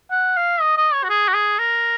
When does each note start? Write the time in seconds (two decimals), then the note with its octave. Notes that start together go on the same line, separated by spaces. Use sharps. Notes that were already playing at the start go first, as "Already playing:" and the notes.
0.11 F#5
0.37 F5
0.61 D#5
0.78 D#5
0.93 C#5
1.04 F#4
1.10 G#4
1.28 F#4
1.34 G#4
1.59 A#4